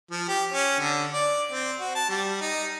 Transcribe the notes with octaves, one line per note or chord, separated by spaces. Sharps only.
F3
G4
C#4
D3
D5
C4
F#4
A5
G3
D#4